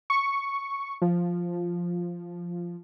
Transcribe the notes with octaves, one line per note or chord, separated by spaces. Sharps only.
C#6
F3